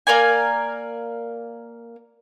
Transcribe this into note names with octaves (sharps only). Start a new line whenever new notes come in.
A#3 A#4 D5 G#5